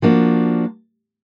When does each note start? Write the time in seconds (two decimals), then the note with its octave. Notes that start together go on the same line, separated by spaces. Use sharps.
0.02 F3 A#3 D4 F#4